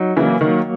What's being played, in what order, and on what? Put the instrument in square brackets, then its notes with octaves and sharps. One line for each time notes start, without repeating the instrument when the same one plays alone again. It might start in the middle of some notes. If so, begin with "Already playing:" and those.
Already playing: [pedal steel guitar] F#3 D#4
[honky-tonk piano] C#3 E3 [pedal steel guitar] A#3
[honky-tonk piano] D#3 [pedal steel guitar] F#3